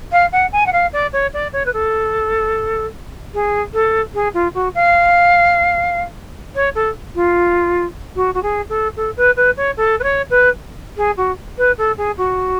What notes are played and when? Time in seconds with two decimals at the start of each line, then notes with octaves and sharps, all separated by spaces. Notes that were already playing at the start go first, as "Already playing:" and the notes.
0.12 F5
0.32 F#5
0.52 G#5
0.66 F#5
0.72 F5
0.93 D5
1.13 C#5
1.34 D5
1.53 C#5
1.66 B4
1.73 A4
3.34 G#4
3.73 A4
4.14 G#4
4.34 F4
4.54 F#4
4.75 F5
6.55 C#5
6.75 A4
7.15 F4
8.16 F#4
8.34 F#4
8.43 G#4
8.69 A4
8.96 A4
9.17 B4
9.36 B4
9.57 C#5
9.77 A4
9.99 B4
10.03 C#5
10.30 B4
10.97 G#4
11.17 F#4
11.58 B4
11.78 A4
11.97 G#4
12.18 F#4